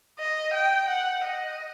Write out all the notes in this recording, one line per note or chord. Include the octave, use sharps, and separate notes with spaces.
D#5
G5
F#5
D#5